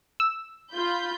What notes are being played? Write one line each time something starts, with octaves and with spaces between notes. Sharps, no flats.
E6
F4 B5 G6